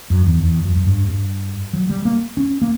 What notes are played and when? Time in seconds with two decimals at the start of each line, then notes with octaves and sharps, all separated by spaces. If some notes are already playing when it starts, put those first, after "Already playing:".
0.10 F#2
0.26 E2
0.43 E2
0.65 F#2
0.76 F#2
0.87 G2
1.09 G2
1.73 F#3
1.90 G3
2.05 A#3
2.37 C#4
2.61 A#3